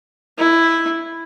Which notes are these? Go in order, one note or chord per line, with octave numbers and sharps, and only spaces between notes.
E4